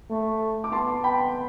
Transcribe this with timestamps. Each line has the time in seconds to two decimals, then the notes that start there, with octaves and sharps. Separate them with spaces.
0.10 A3
0.64 D6
0.72 B3 A5 C6
1.04 G5 B5